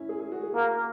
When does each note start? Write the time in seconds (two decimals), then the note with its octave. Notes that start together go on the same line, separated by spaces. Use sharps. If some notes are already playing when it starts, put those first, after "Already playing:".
Already playing: C#4 E4
0.09 G#4
0.20 G#4
0.32 F#4
0.43 G#4
0.55 A#3 F#4